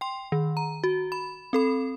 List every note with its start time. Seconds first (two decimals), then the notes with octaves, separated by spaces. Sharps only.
0.01 G5 C6
0.32 D#3
0.57 A#5
0.84 F#4
1.12 B5
1.53 C4 A4 B5